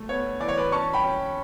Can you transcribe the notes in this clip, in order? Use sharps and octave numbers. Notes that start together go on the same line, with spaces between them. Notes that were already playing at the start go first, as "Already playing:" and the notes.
Already playing: A3
B3 C#5
E3 D5
C#5
B4 D5
C#4 A5 C#6
G5 B5
C#4